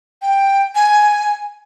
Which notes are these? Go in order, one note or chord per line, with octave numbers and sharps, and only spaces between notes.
G5
G#5